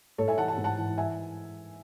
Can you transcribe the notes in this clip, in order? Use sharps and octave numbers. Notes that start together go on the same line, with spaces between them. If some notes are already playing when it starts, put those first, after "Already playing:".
A2 A4 C#5
E5 G#5
E3 F#5 A5
A5
G#2
F#5 A5
E3
E5 G#5